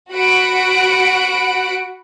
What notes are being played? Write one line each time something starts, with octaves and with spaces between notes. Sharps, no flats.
F#4 F#5 B5 F#6 D7